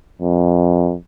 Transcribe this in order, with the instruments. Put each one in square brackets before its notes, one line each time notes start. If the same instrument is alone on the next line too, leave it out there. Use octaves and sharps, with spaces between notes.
[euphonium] F2